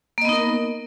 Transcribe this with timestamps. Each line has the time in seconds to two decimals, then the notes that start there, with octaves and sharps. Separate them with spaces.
0.18 A#3
0.21 D#5
0.25 B3
0.29 D#4
0.33 A#4